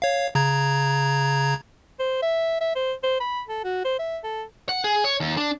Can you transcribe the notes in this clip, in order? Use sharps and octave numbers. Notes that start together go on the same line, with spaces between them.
C#5 F5
C#3 A#5 G#6
C5
E5
E5
C5
C5
B5
A4
F#4
C5
E5
A4
F#5
G#4
C#5
D#2
D4